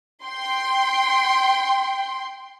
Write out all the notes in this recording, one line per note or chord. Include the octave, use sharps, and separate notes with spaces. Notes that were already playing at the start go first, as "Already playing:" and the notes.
G5 C6